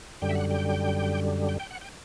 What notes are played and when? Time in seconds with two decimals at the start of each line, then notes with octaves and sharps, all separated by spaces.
0.22 F#2 D3 G3 G5
0.29 E5
0.35 F#5
0.51 G5
1.49 G5
1.60 G5
1.71 F#5
1.81 G5